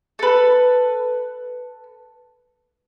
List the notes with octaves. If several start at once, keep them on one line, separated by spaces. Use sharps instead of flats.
A4 B4